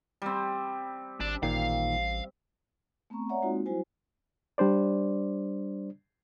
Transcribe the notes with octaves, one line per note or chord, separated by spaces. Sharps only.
G3 C4
G#1 D4
A1 A#2 D#3 F5
A3 B3 C4 A#5 C#6
C#5 D5 E5 F#5 A#5
G#3 A#3 C4 D#4 F4 F#4
F#3 G3 E4 F#4 C5 G#5
G3 D4 C5 D5